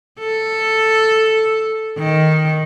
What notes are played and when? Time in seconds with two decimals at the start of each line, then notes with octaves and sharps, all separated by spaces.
0.19 A4
1.98 D#3